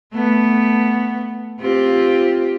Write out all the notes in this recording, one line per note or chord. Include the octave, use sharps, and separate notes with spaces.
A3 B3
C4 F4 G4